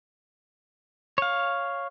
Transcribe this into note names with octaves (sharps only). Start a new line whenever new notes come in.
C#5 F5